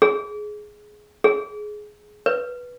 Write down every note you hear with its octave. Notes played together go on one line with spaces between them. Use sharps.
G#4
G#4
B4